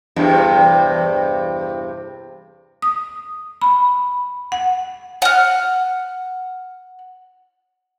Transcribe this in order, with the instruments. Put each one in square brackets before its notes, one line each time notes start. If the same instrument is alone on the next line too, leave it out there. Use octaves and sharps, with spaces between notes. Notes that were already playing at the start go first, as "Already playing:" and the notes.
[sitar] E2 G2 C3
[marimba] D#6
B5
F#5
[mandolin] F#5 F6